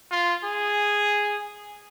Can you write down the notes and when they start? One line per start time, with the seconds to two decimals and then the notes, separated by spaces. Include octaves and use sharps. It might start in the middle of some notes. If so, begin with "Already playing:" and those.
0.11 F4
0.44 G#4